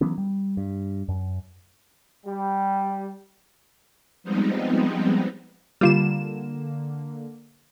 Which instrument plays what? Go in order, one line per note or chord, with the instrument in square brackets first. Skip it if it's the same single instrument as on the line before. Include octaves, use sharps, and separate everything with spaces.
[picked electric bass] E3 F#3 B3 C#4
G3
G2
F#2
[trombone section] G3
[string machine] F3 G3 G#3 B3 C4 D#4
[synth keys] D3 A#3 [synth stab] G3 F4 E7